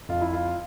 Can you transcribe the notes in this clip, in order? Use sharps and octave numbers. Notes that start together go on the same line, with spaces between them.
F2 F4
E4
F4